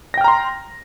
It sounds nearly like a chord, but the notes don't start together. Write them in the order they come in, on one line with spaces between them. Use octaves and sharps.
A#6 G5 F6 A#5 C6